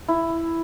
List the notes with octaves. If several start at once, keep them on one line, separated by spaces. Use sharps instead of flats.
E4